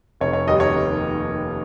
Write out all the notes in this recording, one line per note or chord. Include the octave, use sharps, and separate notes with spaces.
F1 C#5
C#5
D#2 D#3 G3 A#3 D#5
C#5
F1